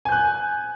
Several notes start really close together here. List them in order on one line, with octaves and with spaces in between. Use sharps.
G#5 G6 F#6